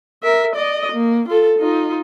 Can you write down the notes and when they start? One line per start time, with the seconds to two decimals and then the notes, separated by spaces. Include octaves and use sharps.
0.23 A#4 E5
0.56 D5 D#5
0.92 A#3
1.29 F4 A4
1.59 D#4 F4